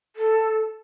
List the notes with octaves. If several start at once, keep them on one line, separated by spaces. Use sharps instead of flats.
A4